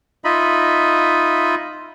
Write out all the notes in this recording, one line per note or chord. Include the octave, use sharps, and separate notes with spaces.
D#4 F4 D#5 E5 B5